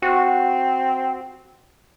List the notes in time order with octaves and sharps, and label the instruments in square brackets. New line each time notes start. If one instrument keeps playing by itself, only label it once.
[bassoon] C4 [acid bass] F#4